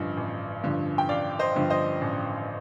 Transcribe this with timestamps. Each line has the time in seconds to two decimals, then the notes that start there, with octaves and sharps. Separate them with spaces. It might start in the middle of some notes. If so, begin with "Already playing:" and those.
Already playing: A1 G2 D3 F3 D#5
0.17 A1
0.63 G2 D3 F3
0.98 G5
1.09 A1 D5 F5
1.39 C5 D#5
1.55 G2 D3 F3
1.70 C5 D#5
2.01 A1